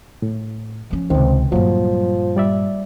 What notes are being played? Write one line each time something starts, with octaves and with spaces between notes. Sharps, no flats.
A2
F3 C#4
C#2 C3 D#3 C4
G2 A#2 F3 F#3
G3 D5 E5